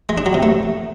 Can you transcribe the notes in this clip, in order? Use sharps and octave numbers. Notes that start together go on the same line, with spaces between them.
G#3
D4
F#3
C3
A3